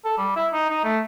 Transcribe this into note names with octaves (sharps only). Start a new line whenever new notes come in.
A4
G3
E4
D#4
D#4
A3